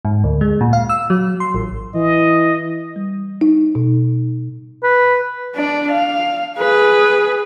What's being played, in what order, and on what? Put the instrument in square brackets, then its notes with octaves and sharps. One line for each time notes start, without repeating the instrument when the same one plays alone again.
[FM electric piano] G#2
D2
G#3
A#2
F5
E6
F#3
C6
A1
[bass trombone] E3 [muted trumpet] D#5
[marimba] G3
D#4
B2
[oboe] B4
[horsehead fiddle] D4 D5
F5
G#4 B4